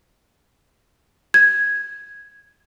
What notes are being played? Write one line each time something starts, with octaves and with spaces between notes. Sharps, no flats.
G#6